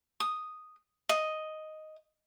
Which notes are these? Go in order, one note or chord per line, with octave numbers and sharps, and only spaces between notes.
D#6
D#5